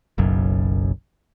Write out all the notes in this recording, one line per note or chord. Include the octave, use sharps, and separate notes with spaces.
F#1 B1 F#2